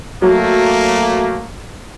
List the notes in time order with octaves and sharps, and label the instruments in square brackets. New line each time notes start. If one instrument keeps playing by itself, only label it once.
[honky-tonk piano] F#3 [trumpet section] A3 A#3